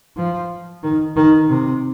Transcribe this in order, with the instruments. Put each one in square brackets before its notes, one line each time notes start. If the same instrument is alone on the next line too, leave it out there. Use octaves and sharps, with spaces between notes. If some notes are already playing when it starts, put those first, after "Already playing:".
[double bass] F3
D#3
D#3
C3